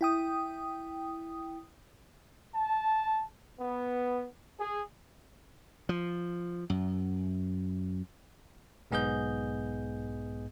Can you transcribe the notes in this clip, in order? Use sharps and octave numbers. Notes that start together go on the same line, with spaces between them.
E4 G5 D#6
A5
B3
G#4
F3
F#2
B1 G#2 B3 G#4 D#5 G6